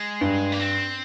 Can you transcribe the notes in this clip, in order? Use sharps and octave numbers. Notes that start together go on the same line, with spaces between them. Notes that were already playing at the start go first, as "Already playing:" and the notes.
Already playing: G#3
G2
A#3
C4